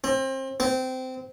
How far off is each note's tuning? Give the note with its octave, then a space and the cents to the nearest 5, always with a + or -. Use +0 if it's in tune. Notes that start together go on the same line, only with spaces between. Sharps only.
C4 +30
C4 -20